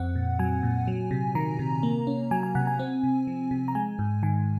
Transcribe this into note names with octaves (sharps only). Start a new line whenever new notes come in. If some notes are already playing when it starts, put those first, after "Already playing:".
Already playing: F2 C4 F#5
A#2
F#3 G#5
A#2
F#3
C3
D#3 A#5
C3
A#3
C#4
F#3 G#5
G#5
C3 F#5
G#5
C4
C3
F3
C3
A#5
G#3 G#5
G#2
D#3 G#5